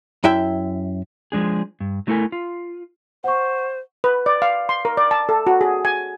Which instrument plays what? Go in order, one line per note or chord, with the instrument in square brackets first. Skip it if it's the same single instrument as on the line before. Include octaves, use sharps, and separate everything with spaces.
[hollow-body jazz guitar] F#2 E4 E5 G5
[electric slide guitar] F3 G#3 D4 G#4
G2
F#3 A3 E4 A4 A#4 G#5
F4
[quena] C5 [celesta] F#5 C#6
[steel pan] B4
D5
F5
C6
A#4
D5
A5
A4
F#4
G#4
G#5